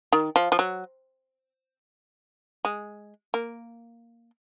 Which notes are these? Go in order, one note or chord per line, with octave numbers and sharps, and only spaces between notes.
D#3
F3
F3
F#3
G#3
A#3